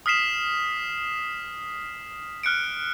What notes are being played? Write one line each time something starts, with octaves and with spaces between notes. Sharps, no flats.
D#6 F6 B6 C7 E7
F6 F#6 C#7 D7